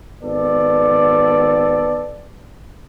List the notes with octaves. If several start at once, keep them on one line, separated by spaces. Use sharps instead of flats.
G#1 B3 A4 D5